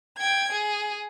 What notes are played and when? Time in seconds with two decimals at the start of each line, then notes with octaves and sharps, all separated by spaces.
0.16 G5 G#6
0.52 G#4